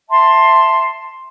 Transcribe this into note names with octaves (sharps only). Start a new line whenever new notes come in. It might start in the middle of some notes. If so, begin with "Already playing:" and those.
E5 A5 C6